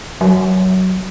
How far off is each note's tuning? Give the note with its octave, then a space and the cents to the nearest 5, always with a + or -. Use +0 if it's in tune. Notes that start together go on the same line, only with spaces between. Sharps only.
F#3 +15